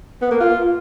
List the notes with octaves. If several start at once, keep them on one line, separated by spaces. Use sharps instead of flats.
B3
A#3
F4